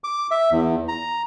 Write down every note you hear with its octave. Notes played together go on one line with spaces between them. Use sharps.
D6
E5
E2
A#5